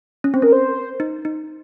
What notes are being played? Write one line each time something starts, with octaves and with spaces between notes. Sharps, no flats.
C#4
C4 C5
C#4 A#4
C5
D#4
D#4